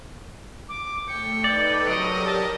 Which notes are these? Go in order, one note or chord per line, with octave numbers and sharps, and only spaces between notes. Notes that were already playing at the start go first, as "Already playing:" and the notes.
D6
A3 G5 C#7
D#4 A4 B4 D5
F#3 G4 A#4 D5 D#5 D7
A5